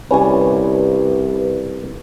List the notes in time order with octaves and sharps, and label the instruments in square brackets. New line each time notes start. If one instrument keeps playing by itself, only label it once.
[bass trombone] C2 [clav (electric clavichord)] C#4 G#5 [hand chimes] E4 G4 D5 [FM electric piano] B4